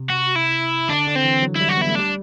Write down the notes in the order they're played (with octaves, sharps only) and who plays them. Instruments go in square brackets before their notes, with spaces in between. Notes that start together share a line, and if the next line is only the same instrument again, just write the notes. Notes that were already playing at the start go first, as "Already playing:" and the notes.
Already playing: [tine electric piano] C3
[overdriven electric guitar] F#4
E4
[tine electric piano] D3 [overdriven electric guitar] D4
[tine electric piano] D3
[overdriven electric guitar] C4
[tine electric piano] E3
F#3
[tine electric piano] G3 [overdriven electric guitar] E4
[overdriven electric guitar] F#4
[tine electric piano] B3 [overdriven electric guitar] E4
[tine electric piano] A3
[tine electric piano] G3 [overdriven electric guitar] D4